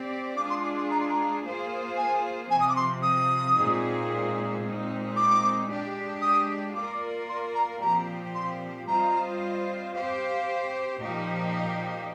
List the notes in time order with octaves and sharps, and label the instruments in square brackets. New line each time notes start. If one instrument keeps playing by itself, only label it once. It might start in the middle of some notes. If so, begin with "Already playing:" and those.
Already playing: [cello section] C4 G4 D5
[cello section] G#3 D4 F4 G#4 [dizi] D6
[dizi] C6
D6
C6
A#5
C6
A#5
[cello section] A#3 F4 G#4 C5
[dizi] G#5
[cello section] C3 F3 C4 [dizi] G#5
[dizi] D#6
D6
C6
D#6
[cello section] A#2 G#3 C4 D#4 G#4
A#2 G#3 C4 D#4
[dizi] D6
[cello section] G#3 D4 G4
[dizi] D#6
[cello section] A#3 F4 A#4 D5 [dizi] D6
[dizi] C6
A#5
[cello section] A#2 F3 C4 G4 [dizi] A#5
[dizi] C6
[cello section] G3 C4 F4 C5 D#5 [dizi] A#5
[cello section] C4 G4 C5 [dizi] F5
[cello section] A#2 F3 A#3 D#4 G4